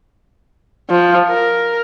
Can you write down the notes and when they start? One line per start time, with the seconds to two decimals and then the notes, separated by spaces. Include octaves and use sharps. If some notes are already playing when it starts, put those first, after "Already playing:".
0.90 F3
1.30 A#4